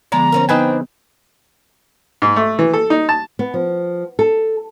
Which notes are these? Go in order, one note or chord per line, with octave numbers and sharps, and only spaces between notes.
D3 F3 G#3 B3 D5 A#5
C4 C#4 A#4
B3 C4 D4 D#4 B4 G5 G#5
G#2
A3
E3
A4
D#4
A5
B3
F3
A4